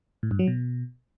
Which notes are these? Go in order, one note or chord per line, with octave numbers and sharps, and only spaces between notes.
A2
G2
F#3
B2